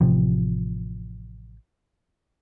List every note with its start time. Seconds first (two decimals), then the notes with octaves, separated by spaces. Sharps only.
0.01 A1 C3 F3